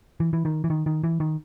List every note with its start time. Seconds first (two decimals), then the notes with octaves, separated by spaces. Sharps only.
0.20 E3
0.33 E3
0.45 D#3
0.64 E3
0.70 D#3
0.86 D#3
1.04 E3
1.20 D#3